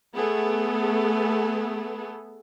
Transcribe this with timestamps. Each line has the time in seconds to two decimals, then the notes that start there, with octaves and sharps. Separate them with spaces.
0.14 A3 B3 G#4 A4